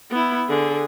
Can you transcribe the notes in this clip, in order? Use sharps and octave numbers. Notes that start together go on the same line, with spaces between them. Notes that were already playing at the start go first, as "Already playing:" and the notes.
B3 E4
D3 G#4